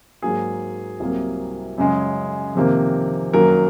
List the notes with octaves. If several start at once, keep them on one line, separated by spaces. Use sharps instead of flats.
G#2 F#3 A#3 G#4
C2 C3 F#3 A#3
F#2 C#3 G#3
F2 C3 D#3 A#3
F#2 D#3 F#3 A#3 A#4